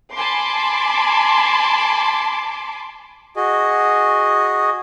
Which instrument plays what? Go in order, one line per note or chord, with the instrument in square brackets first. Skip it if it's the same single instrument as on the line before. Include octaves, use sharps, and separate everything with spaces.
[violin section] G#5 A5 B5 C6 D6
[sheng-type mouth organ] F#4 G#4 D#5